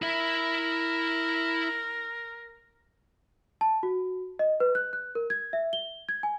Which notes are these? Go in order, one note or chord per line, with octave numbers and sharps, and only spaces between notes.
E4 A#4 E5
A5
F#4
D#5
B4
F#6
F#6
A#4
G#6
E5
G7
G#6
G#5